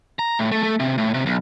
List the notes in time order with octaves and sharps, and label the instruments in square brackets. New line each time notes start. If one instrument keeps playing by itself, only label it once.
[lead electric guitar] A#5
A2
A3
A3
C3
A2
C3
B1